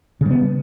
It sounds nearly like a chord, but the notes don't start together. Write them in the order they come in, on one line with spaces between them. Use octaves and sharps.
C#3 G3 B3